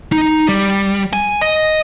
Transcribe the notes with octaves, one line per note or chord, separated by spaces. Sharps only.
D#4
G3
G#5
D#5